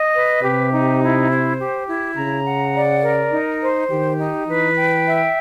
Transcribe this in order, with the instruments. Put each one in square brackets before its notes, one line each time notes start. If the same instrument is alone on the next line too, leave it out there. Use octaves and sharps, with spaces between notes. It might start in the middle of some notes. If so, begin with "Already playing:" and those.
Already playing: [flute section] D#5
B4
[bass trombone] C3 [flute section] G4
[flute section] D#4
E4
C5
G4
E4
[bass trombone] C#3 [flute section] A#5
[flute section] F#5
D5
A#4
D#4
C5
[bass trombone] D#3 [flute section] G4
[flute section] D#4
[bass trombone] E3 [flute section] B4
[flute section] G5
E5